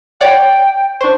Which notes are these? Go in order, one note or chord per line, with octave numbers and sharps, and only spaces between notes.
C#5 D5 F#5 G5
D4 C5 C#6